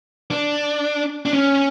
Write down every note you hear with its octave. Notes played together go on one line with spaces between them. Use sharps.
D4
D4
C#4